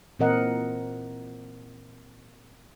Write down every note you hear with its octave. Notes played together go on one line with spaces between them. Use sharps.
A#2 E3 C4 A#4 D#5 F#5